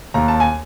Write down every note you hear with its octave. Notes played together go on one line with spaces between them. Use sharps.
D#2 A#5
A5
G#5